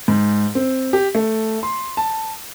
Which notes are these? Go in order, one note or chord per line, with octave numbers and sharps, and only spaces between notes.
G#2
C4
G4
A3
C6
A5